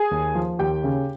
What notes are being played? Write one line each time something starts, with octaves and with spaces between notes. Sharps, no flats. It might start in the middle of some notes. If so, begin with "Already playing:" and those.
Already playing: G#4 G#5
D#2
F3
D#2 G4 G5
C#3